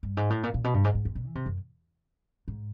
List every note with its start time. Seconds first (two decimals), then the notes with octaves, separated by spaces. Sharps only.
0.03 G2
0.17 G#2
0.30 A2
0.43 A#2
0.54 A#2
0.64 B2
0.74 G2
0.84 G#2
0.95 G#2
1.05 E2
1.15 A#2
1.25 E3
1.35 C3
1.46 F#2
2.48 G#2